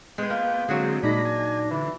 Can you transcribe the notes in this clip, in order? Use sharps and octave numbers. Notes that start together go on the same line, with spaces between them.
G#3 B3 G#4 G5
A#3 F4
D3 F#3 G#3 C4 F#4 G#4
A#2 G#3 D4 D#4 B5 A#6
G#5
D3 E3